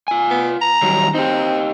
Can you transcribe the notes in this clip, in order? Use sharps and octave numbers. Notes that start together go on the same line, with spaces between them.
F4 G#5
B3
A#5
D#3 F#3 G3
C4 D#4 G4